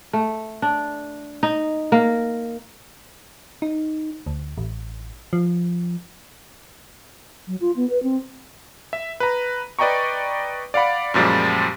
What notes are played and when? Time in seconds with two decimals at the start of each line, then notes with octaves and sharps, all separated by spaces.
0.13 A3
0.62 D4
1.43 D#4
1.92 A#3
3.62 D#4
4.26 D2
4.58 A1
5.33 F3
7.47 F#3
7.61 F4
7.76 B3
7.90 B4
8.03 C4
8.93 E5
9.20 B4 A#5
9.79 B4 D5 D#5 G5 A#5 C#6
10.74 D5 F5 F#5 B5
11.14 F#2 A#2 F3 G3 G#3